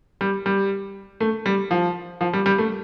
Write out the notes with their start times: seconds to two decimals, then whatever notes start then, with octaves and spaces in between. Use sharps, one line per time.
0.21 G3
0.46 G3
1.20 A3
1.46 G3
1.71 F3
2.21 F3
2.33 G3
2.46 G3
2.58 A3